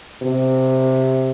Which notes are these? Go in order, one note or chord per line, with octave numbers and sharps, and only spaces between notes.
C3